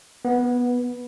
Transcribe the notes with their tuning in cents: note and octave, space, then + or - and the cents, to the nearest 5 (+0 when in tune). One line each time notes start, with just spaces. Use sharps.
B3 -10